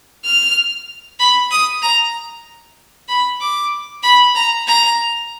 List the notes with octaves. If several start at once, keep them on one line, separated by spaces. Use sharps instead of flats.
F6
B5
D#6
A#5
B5
D6
B5
A#5
A#5